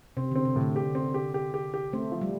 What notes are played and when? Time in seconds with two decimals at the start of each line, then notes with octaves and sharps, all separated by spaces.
0.17 C3 C4
0.31 D3
0.35 C4
0.45 C3
0.56 A2
0.61 D3
0.76 G4
0.95 C4
1.14 G4
1.34 G4
1.54 G4
1.74 G4
1.93 A3 C4
2.12 F3
2.21 G3